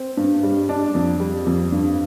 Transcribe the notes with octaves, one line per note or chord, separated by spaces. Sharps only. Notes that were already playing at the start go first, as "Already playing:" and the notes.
Already playing: C4
G2
G3
D4
F2
G3
F2
G2